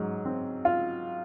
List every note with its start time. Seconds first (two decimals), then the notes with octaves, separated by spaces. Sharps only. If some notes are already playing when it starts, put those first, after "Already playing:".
Already playing: G#2 F#3
0.25 C4
0.65 F4